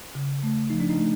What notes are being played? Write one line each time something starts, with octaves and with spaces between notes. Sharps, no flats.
C#3
A3
F3 D#4
D4
D#4
A3